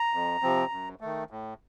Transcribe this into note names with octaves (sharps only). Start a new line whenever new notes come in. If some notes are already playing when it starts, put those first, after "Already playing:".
Already playing: A#5
F2
C3 F3 C4
F#2
D#3 A3
A2